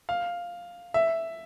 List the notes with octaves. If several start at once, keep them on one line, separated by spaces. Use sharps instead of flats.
F5
E5